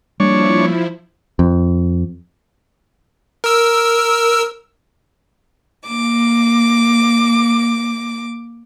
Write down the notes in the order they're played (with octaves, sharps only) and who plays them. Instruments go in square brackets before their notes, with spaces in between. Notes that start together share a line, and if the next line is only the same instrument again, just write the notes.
[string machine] F3 E4 [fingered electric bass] G3 A#3 [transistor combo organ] D4 C#5
[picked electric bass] F2
[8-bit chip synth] A#4 E6
[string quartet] A#3 D6